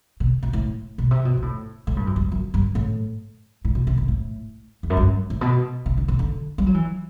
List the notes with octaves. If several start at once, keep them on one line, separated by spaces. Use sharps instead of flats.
B2
B2
A2
B2
C3
B2
B2
A2
A2
G2
F#2
G2
F#2
G2
A2
A2
B2
C3
B2
A2
E2
F#2
G2
A2
B2
C3
D3
C3
D3
G3
F#3
E3